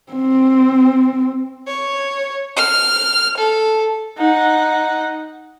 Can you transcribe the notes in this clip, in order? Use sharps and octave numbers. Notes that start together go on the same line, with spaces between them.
C4
C#5
F6
A4
D#4 F#5